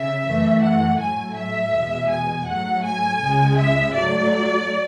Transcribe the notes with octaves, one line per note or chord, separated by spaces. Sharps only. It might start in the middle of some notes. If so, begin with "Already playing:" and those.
Already playing: C#3 E5
F#2 E3 A3
F#5
A2 F#3 A3 G#5
E5
E2 B2 G#3
G#5
G#2 F#3 A3 F#5
G#5
C#2 C#3 G#3
E5
G#2 F#3 A3 D5